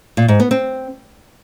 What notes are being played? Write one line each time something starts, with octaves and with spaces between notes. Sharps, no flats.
A#2
G#2
B3
C4